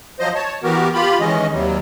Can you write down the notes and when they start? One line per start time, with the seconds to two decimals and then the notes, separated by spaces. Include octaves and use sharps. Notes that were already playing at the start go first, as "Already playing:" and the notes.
0.20 F3 F#3 C5 D#5
0.35 C#5 A5
0.63 E3 B3 F#4 G4 A#4
0.94 F4 G4 B5
1.20 D#3 E3 G#3 C#4 D#5
1.52 D#2 C3 F#3 G3